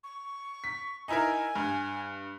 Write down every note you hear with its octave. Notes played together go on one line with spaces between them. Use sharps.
C#6
B6
D#4 E4 A#4 G#5
G2